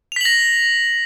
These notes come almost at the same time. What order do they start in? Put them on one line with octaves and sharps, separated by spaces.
F7 B6 F#7 A#6